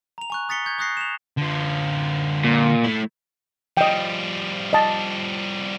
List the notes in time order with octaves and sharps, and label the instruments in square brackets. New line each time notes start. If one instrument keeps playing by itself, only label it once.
[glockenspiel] A#5 F7
G#5 C#6 F#6
D#6 A6 B6 C#7 G7
C#6 G6 G#6
C#6 D#6 F#6 A#6 C7
E7 F7
[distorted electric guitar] D3 F4
[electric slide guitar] A#2
[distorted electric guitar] A3 E4
[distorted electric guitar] F3 G3 [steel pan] D#5 G5
[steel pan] D#5 A5